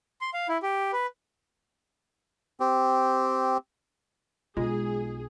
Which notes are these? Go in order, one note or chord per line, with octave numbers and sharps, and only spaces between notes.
C6
F5
E4
G4
B4
C4 G4
B1 G#3 F4 G#4